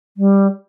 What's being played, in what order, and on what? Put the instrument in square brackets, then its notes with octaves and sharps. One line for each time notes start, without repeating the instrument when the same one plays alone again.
[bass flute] G3